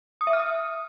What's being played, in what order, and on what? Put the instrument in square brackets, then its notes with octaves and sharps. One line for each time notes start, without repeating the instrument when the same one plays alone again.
[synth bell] D#6
E5
F6
D#6